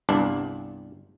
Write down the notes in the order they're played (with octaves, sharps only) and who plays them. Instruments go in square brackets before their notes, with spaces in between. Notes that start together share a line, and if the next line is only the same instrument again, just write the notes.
[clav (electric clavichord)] G1 C2 G2 D4